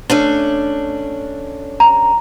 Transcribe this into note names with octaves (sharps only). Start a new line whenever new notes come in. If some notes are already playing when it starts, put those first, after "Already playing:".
A3 C#4 D4
A#5